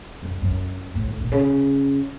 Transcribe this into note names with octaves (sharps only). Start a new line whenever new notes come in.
F#2
F#2
A2
D#3
A#2
C#3